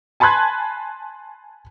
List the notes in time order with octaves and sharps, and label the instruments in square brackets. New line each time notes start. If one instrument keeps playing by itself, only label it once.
[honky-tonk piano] G#5 A5 B5 C6 F#6 G#6